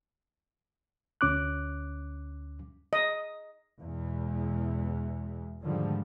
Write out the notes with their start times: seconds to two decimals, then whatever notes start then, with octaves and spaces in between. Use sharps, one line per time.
1.21 D2 C#4 D6 F#6
2.93 D#5
3.79 E2 B2 G#3
5.62 G#2 D3 D#3 F3 G3 G#3